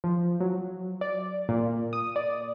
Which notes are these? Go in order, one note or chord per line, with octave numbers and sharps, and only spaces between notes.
F3
F#3
D5
A#2
D#6
D5